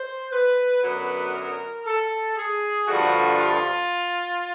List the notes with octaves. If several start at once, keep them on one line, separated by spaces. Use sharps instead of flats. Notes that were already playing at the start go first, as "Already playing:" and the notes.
Already playing: C5
B4
F#2 D3 F#3 B3 B4
A#4
A4
G#4
G2 D3 F3 A3 F#4
F4